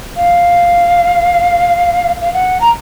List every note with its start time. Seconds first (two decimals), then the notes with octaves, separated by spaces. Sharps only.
0.17 F5
2.21 F5
2.34 F#5
2.61 A#5